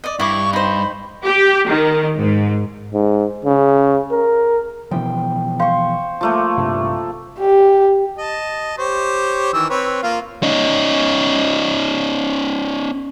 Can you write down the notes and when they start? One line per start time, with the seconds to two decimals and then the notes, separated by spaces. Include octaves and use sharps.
0.04 D5 D#5
0.20 G2 E4 C#6 D6
0.53 D#4 C5 B5
1.24 G4
1.68 D#3
2.16 G#2
2.93 G#2
3.45 C#3
4.12 A#4
4.91 B2 E3 F3 G5
5.60 C5 F5 C#6
6.21 F3 A3 A#3
6.58 A#1 G2 C3
7.39 G4
8.18 D#5 A5
8.78 G4 C5 C#5
9.53 D#3 E3 E6
9.70 C4 B4 C#5
10.03 A#3 F4 F5
10.43 C#4 D#4